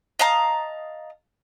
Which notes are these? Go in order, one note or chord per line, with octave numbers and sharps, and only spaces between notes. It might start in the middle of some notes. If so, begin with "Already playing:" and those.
D#5 F5 A5 A#5